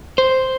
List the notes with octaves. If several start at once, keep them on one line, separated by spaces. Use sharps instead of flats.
C5